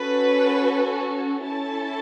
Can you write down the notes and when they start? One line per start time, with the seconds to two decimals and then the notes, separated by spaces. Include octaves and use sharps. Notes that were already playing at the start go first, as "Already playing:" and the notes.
Already playing: C#4 F#4 A4 B4
1.45 C#4 E4 A4 A5